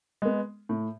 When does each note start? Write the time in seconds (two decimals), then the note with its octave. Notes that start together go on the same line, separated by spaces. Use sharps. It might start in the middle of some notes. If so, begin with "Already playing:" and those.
0.22 G#3 B3
0.69 A2